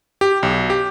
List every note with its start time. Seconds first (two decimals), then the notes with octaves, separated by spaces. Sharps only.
0.21 G4
0.43 B1
0.70 G4